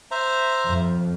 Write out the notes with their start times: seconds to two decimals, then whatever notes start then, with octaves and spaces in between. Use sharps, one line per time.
0.11 C5 E5 A#5
0.66 F2